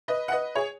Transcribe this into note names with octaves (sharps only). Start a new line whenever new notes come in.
B4 D#5
F#5
B4 D#5
G#4 C#5